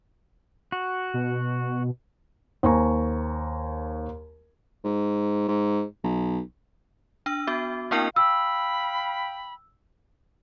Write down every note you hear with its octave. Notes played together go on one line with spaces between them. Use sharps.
F#4
B2
D#2 C5 G#5 A#5 C#6
G#2
G#2
B1
D4 E6
B3 F#4
A#3 C4 D4 E4 A#4 G5
F5 G5 B5 E6